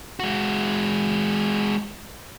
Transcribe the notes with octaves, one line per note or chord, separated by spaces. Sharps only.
G#3 F#4